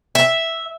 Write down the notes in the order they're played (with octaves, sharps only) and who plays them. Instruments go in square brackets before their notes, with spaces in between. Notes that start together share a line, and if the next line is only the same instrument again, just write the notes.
[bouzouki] E5